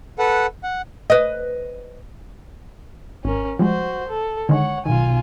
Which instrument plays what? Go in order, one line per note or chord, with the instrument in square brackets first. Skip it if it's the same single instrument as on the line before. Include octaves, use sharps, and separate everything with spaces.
[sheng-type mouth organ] A4 B4 F#5
F#5
[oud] B4 D#5
[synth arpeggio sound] G#1 [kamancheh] C#4 A#4
[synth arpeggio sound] F3 G3 G#3 [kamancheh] F#4 C5
[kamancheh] A4
[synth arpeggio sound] D3 D#3 G#3 [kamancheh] C#5 F#5
[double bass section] B1 [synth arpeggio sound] D#3 [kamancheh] F4 G#5